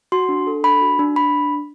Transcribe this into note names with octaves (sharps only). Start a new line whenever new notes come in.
F#4 C6
D4
A4
D4 B5
F#4
D4
D4 B5